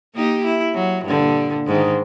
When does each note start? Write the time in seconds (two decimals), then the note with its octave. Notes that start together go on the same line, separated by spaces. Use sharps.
0.15 A#3 D#4 G4
0.45 E4
0.75 F#3
1.05 G2 A#2 D3
1.67 G#2 D#3